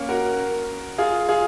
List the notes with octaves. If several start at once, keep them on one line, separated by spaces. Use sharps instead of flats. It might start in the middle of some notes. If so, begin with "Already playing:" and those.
Already playing: A#3 C#4
F#4 A#4
F4 G#4
F4 G#4